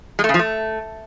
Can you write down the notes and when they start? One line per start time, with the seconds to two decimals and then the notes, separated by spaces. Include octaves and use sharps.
0.19 G#3
0.24 A3
0.29 C#3
0.34 F3
0.39 A3